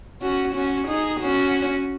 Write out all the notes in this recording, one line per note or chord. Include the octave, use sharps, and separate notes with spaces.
C#4 F#4
C#4 F#4
D#4 G#4
C#4 F#4